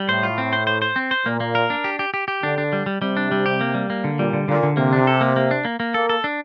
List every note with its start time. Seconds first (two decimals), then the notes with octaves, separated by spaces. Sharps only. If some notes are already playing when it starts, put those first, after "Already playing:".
Already playing: G3
0.09 A2 C5
0.23 F4
0.38 C4
0.53 C5
0.67 C5
0.82 C5
0.96 C4
1.11 C5
1.26 A#2 A#3
1.40 A#3
1.55 A#4
1.70 D4
1.84 G4
1.99 G4
2.14 G4
2.28 G4
2.43 D3 D4
2.58 D4
2.73 G3
2.86 G3
3.01 C3 G3
3.17 D4
3.32 G3
3.46 G4
3.61 A#3
3.74 G3
3.90 A#3
4.04 D3
4.19 A#2 G3
4.33 D3
4.48 A#2 D3
4.63 D3
4.77 C3 A#3
4.93 D4
5.07 A4
5.21 A#3
5.36 A#3
5.51 D4
5.65 A#3
5.80 A#3
5.94 A#3 A4
6.09 A4
6.24 D4